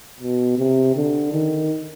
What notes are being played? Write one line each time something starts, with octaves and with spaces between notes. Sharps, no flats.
B2
C3
D3
D#3